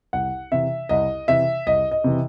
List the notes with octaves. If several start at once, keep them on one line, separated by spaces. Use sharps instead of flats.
C2 F#5
C3 E3 E5
C2 D#5
C3 E3 E5
C2 D#5
D#5
C3 E3